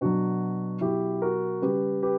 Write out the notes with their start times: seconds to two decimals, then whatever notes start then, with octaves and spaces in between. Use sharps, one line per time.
0.01 B2 F#3 D4 F#4
0.81 B2 F#3 E4 G4
1.22 F#4 A#4
1.62 C#3 G3 G4 B4
2.03 G4 B4